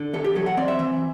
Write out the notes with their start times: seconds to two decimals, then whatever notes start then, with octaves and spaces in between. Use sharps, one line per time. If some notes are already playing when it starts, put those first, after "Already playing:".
Already playing: D3
0.13 E2 A4
0.24 G4
0.35 F#3 A4
0.46 F#5
0.57 C4 D5
0.68 E5
0.79 E3